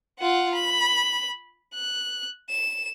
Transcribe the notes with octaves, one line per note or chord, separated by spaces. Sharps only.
F4 F#5
B5
F#6
E7